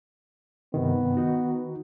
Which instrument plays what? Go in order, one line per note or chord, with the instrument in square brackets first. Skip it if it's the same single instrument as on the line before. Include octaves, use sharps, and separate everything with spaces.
[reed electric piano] G2 C3 D#3 [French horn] B3
[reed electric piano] D#3 D#4 F#4